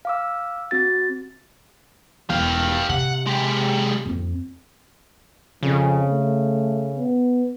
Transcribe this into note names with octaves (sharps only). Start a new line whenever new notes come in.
F5 D6 E6
C4 F#4 A6
E1 G4 F5
C3 F#5
G#3 G4
F2 C4
F2 C#3
A3
B3